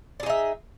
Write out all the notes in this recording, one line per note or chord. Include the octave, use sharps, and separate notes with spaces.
D#4 G#4 D5 E5